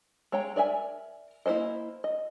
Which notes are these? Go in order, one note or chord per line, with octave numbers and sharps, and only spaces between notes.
G#3 C#5 G5 A#5
A#4 D5 E5 G#5
A#3 E4 A#4 C5 D#5
D#5